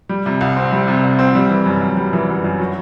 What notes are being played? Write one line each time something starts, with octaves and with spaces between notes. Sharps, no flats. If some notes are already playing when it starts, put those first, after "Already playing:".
G3
C3
C2
C4
G3
C3
C2
C4
G3
E3
F#2
F#2
G3
E3
F#2
F#2
F#3